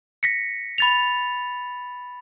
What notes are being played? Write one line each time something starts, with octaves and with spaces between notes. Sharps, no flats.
A#6 B6 C#7
B5 A6 F7